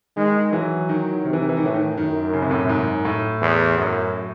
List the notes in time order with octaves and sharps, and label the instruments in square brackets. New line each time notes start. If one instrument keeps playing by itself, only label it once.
[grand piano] D#3 [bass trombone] G#3
[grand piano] E3 [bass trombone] F#3
[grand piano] D#3
[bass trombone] C3 [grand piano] D#3
[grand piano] E3
D#3
E3
D#3
[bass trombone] A2 [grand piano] E3
[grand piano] D#3
[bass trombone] F#2 [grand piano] D#3
[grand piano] C#3
C3
A2
C3
G#2
A2
[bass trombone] E2
F#2